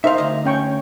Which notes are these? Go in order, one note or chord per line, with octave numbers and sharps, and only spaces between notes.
D#4 A#4 C5 E5 F5
D2 D#5
C#4 G5 C#6